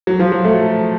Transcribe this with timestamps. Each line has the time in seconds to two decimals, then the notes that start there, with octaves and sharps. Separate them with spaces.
0.07 F#3
0.19 F3
0.32 F#3
0.45 A3